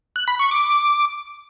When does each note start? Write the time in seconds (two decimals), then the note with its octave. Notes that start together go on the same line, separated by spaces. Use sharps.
0.16 F#6
0.28 B5
0.39 C#6
0.51 D6